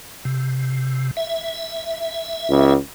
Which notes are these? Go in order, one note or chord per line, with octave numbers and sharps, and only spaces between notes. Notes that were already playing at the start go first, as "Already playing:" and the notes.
C3
E5
C#2